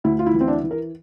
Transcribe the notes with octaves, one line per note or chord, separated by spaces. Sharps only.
D2 E4
F4
E4
E3
C4
D4
E3
A#4